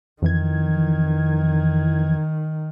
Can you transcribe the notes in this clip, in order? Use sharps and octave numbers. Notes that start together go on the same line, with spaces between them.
F2 D#3 E3 G#6